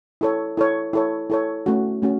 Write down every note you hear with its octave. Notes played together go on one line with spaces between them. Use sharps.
E4 A4 C#5
E4 A4 C#5
E4 A4 C#5
E4 A4 C#5
A3 C#4 F#4
A3 C#4 F#4